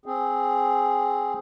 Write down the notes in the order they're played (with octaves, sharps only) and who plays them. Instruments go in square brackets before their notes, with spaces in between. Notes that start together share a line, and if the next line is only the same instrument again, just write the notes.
[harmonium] C4 G#4